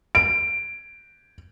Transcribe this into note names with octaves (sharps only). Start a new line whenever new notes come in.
D7